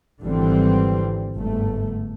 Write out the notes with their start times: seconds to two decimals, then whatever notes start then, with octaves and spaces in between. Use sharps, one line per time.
0.21 G#1 D3 E3 G3 C4
1.36 G1 G#2 A3